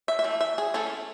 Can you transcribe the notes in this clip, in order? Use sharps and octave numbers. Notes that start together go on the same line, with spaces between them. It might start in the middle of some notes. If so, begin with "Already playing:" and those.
E5
E5
E3 A3
E5
G#4
E3 A3 C#4 E4 A4